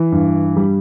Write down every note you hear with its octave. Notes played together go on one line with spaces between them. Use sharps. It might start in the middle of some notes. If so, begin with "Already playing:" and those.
Already playing: E3
G2
G3